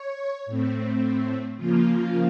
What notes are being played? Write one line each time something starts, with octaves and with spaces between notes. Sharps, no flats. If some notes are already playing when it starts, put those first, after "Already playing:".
Already playing: C#5
A2 A3 C4
C#3 F3 A#3 F4